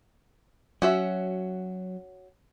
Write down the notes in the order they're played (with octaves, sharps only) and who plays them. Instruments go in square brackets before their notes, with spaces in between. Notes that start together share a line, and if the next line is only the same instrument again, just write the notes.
[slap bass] F#3 [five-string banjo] C#4 F#4 E5